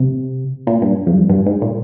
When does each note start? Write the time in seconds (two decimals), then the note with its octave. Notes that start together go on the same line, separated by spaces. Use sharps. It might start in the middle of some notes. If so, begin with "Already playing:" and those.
Already playing: C3
0.67 A#2
0.82 G2
1.06 F2
1.14 G2
1.29 G2
1.46 G#2
1.62 A#2